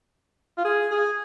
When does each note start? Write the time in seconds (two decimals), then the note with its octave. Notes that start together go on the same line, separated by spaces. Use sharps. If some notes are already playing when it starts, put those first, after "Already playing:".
0.58 F4
0.65 G#4
0.91 G#4